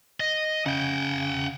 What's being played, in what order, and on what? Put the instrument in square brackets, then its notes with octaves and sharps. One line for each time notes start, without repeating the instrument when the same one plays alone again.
[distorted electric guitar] D#5
[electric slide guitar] C#3 [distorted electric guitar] F#5 G5